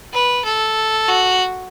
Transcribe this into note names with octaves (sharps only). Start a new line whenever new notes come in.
B4
A4
F#4